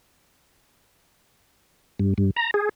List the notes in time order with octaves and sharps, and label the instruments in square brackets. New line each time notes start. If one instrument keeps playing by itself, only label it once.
[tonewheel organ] G2
G2
A#5
G#4